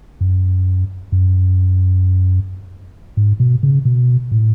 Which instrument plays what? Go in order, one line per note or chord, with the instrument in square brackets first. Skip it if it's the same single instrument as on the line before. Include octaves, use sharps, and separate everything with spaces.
[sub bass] F#2
F#2
G#2
B2
C#3
B2
A2